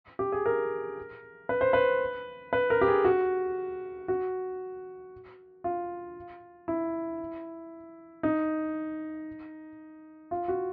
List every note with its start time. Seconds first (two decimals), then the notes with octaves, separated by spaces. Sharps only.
0.19 G4
0.32 G#4
0.46 A#4
1.49 B4
1.61 C5
1.73 B4
2.53 B4
2.70 A#4
2.81 G4
2.88 G#4
3.05 F#4
4.08 F#4
5.64 F4
6.68 E4
8.23 D#4
10.31 F4
10.48 F#4